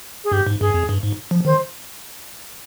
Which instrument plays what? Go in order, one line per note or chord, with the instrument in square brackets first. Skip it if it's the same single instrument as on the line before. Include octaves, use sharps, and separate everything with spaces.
[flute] G#4
[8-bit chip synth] G2 [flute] G4
[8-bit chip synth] G#2
[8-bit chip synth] G2 [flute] G#4
[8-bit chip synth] F2
G2
G#2
F3
[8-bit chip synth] D#3 [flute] C5